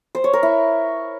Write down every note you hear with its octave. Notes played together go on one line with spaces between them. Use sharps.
C5
C#5
A#4
E4